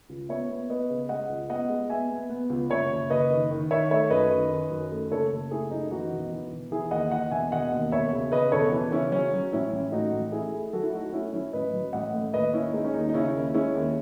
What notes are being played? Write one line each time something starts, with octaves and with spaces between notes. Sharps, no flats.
C#2
B3 C#5 E5
B3
B3 B4 D#5
C#3
G#3 D#5 F#5
C#2
B3 D#5 F#5
G#3
B3 E5 G#5
B3
B3
C#2
F#1 C#5 E5
F#1
F#1 B4 D#5
D#3
D#3
D#3 C#5 E5
A3 C#5 E5
F#2 B4 D#5
D#3
D#3
F#2
A3
F#1 A4 C#5
F#1
A3 E4 G#4
F#2 D#4
E3 D#4 F#4
E1
E3
E1
E3 E4 G#4
D#2 D#5 F#5
E3 D#5 F#5
E1 E5 G#5
E1 D#5 F#5
D#2
E1 C#5 E5
C#3
C#3 B4 D#5
E1 A4 C#5
E3
C#3 C#4 E4
F#3 C#4
F#3
A1 C#4 E4
A1
A2 D#4 F#4
A1
A3 E4 G#4
A3
F#3 F#4 A4
E4
A3 D#4 F#4
A3 C#4 E4
F#3 C#4 E4
A1 B4 D#5
F#3
A1 D#5 F#5
A2
D#2 B4 D#5
D#2 C#4 E4
G#3 D#4
C#4
D#2 D#4
D#4
C#3 C#4 E4
D#2
G#3 C#4 E4
D#2